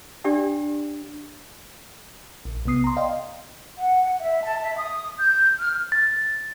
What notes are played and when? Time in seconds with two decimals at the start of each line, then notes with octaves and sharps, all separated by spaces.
0.24 D4 G4 D5 G5
2.45 A#1
2.65 B1 C3 B3 D#6 C7
2.84 A#5 C6
2.97 D5 D#5 F5 G5
3.78 F#5
4.20 E5
4.43 A5
4.61 E5
4.77 D#6
5.18 G6
5.60 F6
5.92 A6